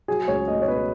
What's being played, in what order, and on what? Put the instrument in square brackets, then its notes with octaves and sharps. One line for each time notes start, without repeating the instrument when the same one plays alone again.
[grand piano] F#3 G#4
C#2 C#5
A3 D#5
C#5
B2 B4